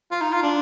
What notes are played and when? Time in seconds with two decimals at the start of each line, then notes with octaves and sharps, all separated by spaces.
0.11 F4
0.21 D#4
0.32 F4
0.43 D4